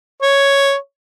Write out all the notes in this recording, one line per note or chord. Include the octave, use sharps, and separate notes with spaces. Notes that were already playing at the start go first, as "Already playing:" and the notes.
C#5